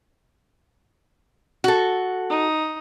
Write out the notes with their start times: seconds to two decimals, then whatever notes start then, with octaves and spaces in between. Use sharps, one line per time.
1.64 F#4 A4
2.29 D#4